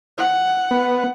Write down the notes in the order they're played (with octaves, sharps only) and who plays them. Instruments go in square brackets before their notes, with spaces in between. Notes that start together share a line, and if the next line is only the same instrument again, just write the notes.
[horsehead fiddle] F#5
[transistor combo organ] B3